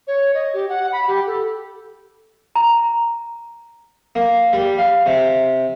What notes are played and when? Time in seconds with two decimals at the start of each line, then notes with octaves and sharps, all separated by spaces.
0.07 C#5
0.35 D#5
0.54 G4
0.69 F#5
0.93 B5
1.08 G4
1.27 A4
2.56 A#5
4.16 A#3
4.53 G3
4.78 F5
5.06 C3